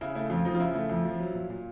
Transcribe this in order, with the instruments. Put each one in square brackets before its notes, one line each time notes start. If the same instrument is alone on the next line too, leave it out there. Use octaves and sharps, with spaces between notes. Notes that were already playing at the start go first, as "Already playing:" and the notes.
[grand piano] C#3 E4
A3 E4
F2 F4
F3 D#4
F4
C#3 E4
A3
F2
F3
F#3
A#2
A#2